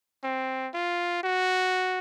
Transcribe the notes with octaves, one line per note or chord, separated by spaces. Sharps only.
C4
F4
F#4